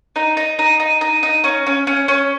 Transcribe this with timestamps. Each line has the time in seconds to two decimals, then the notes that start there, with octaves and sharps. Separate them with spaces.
0.16 D#4
0.37 D#4
0.59 D#4
0.80 D#4
1.01 D#4
1.23 D#4
1.44 C#4
1.67 C#4
1.87 C#4
2.08 C#4